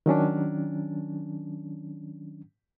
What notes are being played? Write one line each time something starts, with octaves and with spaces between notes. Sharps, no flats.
D#3 F#3 C#4 D4